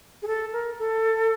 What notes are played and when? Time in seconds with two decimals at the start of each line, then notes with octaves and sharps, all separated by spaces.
0.22 G#4
0.27 A4
0.53 A#4
0.79 A4